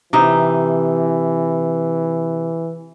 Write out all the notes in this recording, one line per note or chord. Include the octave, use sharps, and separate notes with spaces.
C3 E3 D#4 E5